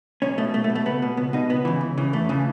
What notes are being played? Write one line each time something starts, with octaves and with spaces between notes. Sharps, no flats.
B1 C#4
B2 A3
B1 A3
A3
B2
A3
C#2 B3
B2
C#2 B3
B2 D#4
C#2 B3
C#3 E3
C#2
C#3 E3
E2 A3
C#3 E3